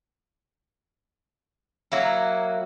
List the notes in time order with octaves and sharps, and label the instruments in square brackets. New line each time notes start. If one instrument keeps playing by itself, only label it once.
[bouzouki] F#3 A#3 E4